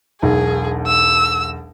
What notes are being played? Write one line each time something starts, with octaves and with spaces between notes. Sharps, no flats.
E1 B1 G#4
E6